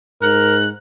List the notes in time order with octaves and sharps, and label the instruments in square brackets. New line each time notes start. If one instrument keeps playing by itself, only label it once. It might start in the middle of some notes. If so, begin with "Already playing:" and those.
[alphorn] G#2 [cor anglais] A#4 [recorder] F#6